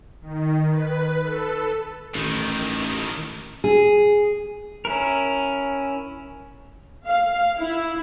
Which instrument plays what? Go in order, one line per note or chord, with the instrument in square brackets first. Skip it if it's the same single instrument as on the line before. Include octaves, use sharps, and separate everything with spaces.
[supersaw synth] D#3
B4
A4
[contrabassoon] A1 [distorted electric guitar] A2 D#3
[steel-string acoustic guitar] G#4
[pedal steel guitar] C#4 E4 A#4
[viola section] F5
E4